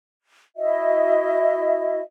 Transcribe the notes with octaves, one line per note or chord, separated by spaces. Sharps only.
E4 F#4 D#5 E5